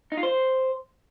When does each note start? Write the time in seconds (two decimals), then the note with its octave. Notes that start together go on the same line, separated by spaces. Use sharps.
0.12 D#4
0.17 F4
0.23 C5